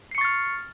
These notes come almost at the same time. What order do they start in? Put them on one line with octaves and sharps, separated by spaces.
C7 C#7 C#6 A6 F6